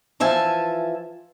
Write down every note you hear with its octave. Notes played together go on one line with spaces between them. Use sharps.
E3 F3 E5 G#5 A5